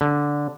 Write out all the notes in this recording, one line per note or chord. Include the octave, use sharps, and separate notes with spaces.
D3